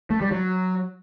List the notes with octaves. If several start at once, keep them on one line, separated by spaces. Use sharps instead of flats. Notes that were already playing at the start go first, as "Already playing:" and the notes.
A3
G3
F#3